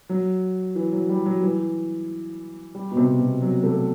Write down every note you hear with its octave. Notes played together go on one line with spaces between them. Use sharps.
F#3
E3
F#3
G3
F#3
E3
G3
B2
C3
B2
F#3
A3